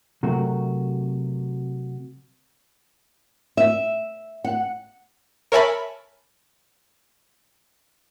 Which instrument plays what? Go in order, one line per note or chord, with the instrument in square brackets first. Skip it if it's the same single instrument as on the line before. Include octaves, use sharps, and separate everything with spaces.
[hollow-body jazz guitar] C3 F#3 A3 F#4 A#4
[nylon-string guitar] E5
F#5
[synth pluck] A#4 C#5 E5 G#5 A5 B5